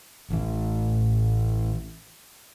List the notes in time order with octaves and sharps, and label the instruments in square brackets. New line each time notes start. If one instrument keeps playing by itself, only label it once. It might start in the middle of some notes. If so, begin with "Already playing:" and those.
[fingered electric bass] A1 E3